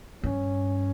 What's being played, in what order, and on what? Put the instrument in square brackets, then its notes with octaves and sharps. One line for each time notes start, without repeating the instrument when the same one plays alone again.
[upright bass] G2 [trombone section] C#4